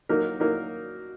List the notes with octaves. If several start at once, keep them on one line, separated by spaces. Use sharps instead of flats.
F#3 A#3 D#4 A#4
F#3 A#3 D#4 A#4